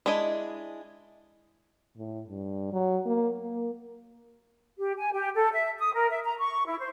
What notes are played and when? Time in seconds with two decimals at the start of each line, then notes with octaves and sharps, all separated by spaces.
0.06 G#3 D4 E4 D#5
1.97 A2
2.28 G2
2.72 F#3
3.05 A#3
3.39 A#3
4.78 G4
4.98 G#5
5.13 G4
5.35 A4
5.52 E5
5.79 D#6
5.94 A#4
6.10 E5
6.24 A#5
6.39 C#6
6.66 E4
6.79 C5